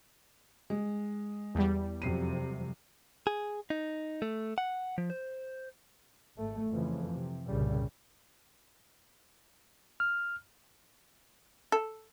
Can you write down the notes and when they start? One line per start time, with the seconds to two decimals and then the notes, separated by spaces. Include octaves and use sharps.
0.70 G#3
1.55 E2 G3
2.02 F2 C3 F#3 C7 D#7
3.27 G#4
3.70 D#4
4.22 A3
4.58 F#5
4.98 F3
5.10 C5
6.37 G#1 A3
6.69 F2 C#3 E3 F3
7.10 C3
7.48 C2 G2 A#2 C#3 G3
10.00 F6
11.72 A4